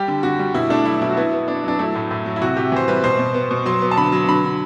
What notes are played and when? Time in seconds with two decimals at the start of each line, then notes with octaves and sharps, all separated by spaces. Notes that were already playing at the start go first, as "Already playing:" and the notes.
Already playing: G3 G4
0.08 D3
0.23 D3 F#4
0.39 G3
0.54 B2 E4
0.70 A3 D4
0.86 F#3 E4
1.01 B2 E4
1.10 F#4
1.17 B3 E4
1.33 B3
1.48 B3 D4
1.64 F#3 D4
1.79 A3 E4
1.95 A2
2.11 A2
2.26 F#3
2.36 E4
2.41 C3 F#4
2.57 C3 G4
2.72 E3 C5
2.88 G3 B4
3.03 B2 C5
3.19 B2
3.34 B3
3.51 B2
3.66 F#3 C6
3.81 B3
3.91 A5
3.97 D3 B5
4.12 F#3
4.29 D3 B5
4.44 D3